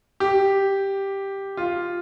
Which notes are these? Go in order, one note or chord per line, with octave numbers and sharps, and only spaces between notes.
G4
F4